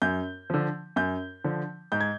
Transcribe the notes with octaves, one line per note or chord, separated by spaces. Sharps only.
F#2 G6
D3 F3
F#2 G6
D3 F3
G#2 G6
G#6